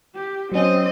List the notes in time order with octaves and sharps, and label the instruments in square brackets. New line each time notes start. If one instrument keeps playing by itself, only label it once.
[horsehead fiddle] G4
[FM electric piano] F#3 C#4 [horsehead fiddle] C4 D#5